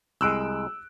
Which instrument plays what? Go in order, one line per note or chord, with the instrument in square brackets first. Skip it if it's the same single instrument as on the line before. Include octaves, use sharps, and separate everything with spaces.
[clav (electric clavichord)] C2 G#3 [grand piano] E6 F#6 D7